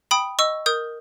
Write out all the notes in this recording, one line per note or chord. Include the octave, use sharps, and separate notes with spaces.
G5 B5 D#6
D#5 C#6 E6
A#4 D#6 G6